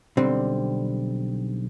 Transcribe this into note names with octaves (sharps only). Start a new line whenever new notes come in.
B1 D3 G3 C4